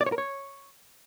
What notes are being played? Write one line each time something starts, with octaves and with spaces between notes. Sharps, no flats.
D5
C#5
A#4
C#5